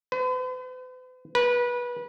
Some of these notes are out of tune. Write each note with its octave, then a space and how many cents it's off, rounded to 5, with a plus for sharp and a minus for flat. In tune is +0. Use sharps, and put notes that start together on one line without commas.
B4 +45
B4 -25